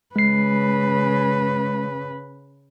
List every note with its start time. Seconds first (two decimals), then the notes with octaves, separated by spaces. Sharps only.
0.16 C#3 G#3 B4 C7